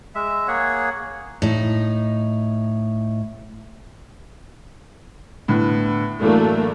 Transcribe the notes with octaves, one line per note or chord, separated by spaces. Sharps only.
G#3 E5
A#3 G#4 C#5 F#5
A2 D#4
A2 D3 B3
A2 E3 F#3 A3 A#3 D4